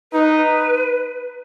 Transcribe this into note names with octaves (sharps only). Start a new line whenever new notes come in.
D#4 B4